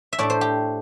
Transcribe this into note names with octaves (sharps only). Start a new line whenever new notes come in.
E5
A2 A3 D4 D5
C5
G4